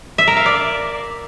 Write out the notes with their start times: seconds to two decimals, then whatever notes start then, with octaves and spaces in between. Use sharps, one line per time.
0.18 E5
0.27 A#4
0.37 F5
0.46 D5